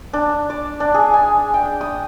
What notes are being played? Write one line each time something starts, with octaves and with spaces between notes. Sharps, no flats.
D4
D5
D4
G#4
G#5
G5
D#6